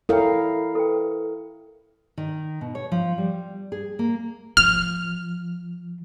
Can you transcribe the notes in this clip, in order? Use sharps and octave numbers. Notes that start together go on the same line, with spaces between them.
E4 A4 A#4 C#5 F5 G5
A4 B4 G5
D#3
B2
C#5
F3
G3
G#4
A#3
F3 F6